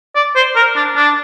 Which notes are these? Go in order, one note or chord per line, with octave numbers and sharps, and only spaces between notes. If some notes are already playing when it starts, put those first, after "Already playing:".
D5
C5
A#4
D4
D4